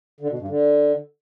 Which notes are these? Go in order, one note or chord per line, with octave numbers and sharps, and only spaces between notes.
D3
B2
G2
D3